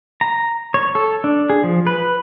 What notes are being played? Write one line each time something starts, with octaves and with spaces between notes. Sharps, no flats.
A#5
C#5
A4
D4
G#4
F3
B4